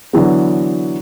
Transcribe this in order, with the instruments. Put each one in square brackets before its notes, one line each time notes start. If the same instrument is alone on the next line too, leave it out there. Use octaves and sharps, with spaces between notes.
[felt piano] D3 E3 F#3 B3